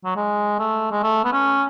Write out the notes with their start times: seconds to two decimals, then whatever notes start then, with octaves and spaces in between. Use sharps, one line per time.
0.05 F#3
0.16 G#3
0.60 A3
0.92 G#3
1.03 A3
1.25 B3
1.33 C#4